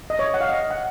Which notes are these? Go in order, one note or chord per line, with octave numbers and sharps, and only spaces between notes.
D#5
C#5
F#5
F5
D#5
F#5